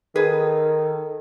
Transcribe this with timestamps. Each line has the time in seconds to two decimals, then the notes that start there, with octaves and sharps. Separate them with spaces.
0.16 D#3 G#4 A4 B4